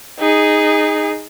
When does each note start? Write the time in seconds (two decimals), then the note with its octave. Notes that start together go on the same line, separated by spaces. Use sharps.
0.19 D#4 G#4